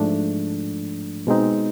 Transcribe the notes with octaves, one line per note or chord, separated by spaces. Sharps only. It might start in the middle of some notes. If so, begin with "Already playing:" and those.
Already playing: G#2 F3 A3 D4
B2 G#3 C4 D#4